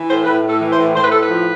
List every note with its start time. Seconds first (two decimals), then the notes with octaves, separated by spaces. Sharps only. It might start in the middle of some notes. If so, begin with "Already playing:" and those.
Already playing: E3
0.08 A2 C5
0.25 A2 B4
0.42 A2
0.49 A4
0.60 E3
0.71 C5
0.78 A2
0.96 A2 C5
1.04 B4
1.11 A2 A4
1.20 B4
1.30 F3